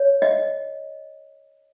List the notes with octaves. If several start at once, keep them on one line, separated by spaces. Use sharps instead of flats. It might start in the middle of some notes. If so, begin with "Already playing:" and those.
Already playing: C#5
D#5